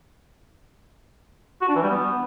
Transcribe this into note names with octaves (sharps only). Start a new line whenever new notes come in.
F#4
D4
E3
G3
B3